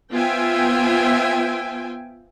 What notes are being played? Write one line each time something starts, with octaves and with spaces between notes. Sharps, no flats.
B3 F4 C5 E5 G5 G#5